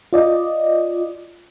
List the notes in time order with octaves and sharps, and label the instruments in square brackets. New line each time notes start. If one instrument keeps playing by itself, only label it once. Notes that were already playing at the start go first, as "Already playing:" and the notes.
[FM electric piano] F4 D5 D#5